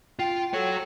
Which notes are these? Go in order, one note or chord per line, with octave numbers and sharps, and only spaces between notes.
F4 G5
F#4 A4 C#5